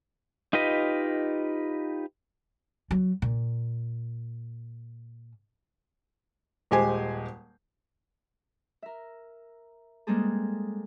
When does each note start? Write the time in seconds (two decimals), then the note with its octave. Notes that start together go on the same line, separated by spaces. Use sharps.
0.53 D#4 F4 G4 B4 D#5
2.91 F#3
3.22 A#2
6.71 D#1 G#3 G4 C5 G#5
8.82 A#4 E5
10.07 G3 G#3 A#3 C4 G#4 A4